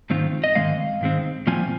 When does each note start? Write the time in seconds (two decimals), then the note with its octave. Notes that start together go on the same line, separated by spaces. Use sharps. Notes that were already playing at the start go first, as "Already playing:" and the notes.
0.10 G#2 D#3 C4 F4
0.44 D#5
0.55 G#2 D#3 G#3 C4 F5
1.01 G#2 D#3 G#3 C4
1.47 A#2 F3 C4 F4 G#5